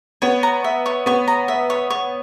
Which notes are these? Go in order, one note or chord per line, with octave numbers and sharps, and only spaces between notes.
B3 C#5
A#5
E5
C#5
B3 C#5
A#5
E5
C#5
C#5